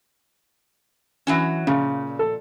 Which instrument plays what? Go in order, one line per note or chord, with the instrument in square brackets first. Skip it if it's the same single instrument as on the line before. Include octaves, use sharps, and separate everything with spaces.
[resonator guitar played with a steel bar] E3 F#3 C#4
[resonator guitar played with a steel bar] A#2 [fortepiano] C#3
[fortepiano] A4